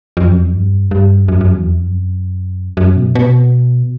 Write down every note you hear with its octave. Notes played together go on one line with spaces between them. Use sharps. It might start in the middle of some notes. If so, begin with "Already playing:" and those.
F2
F#2
F2
G2
G2
F#2
F#2
E2
F2
F#2
F#2
B2
B2